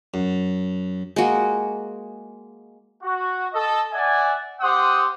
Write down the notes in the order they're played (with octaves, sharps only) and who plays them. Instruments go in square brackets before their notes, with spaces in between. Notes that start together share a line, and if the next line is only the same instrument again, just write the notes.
[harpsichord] F#2
[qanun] G#3 A#3 F#4
[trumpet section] F#4
A4 D#5
D5 E5 F#5 G#5
C4 G4 C5 F#5 C6 D#6